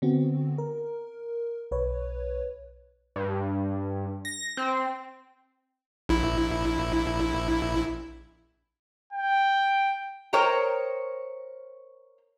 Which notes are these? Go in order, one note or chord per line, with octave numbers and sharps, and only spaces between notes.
D3 B3 C4 F#4
A#4
B1 B4 C#5
G2
A#6
C4
A#1 E4
G5
A#4 C5 C#5 D#5 G5 A#5